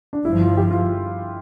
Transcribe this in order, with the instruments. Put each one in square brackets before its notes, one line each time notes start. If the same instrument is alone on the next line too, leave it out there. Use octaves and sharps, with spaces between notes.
[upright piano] D4
[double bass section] G1 G2 F3 [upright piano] E4
[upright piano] F4
G4
F4